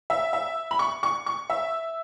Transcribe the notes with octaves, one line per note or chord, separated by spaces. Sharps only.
E5
E5
B5
C#6
C#6
C#6
E5